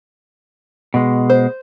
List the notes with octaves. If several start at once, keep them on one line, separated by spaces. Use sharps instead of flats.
B2 G#3
C5